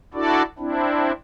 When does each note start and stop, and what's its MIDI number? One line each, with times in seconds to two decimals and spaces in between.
0.14 0.43 62
0.14 0.43 64
0.14 0.43 66
0.14 0.43 69
0.14 0.43 74
0.59 1.12 60
0.59 1.12 62
0.59 1.12 64